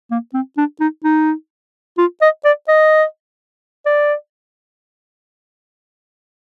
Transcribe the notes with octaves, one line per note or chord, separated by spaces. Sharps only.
A#3
C4
D4
D#4
D#4
F4
D#5
D5
D#5
D5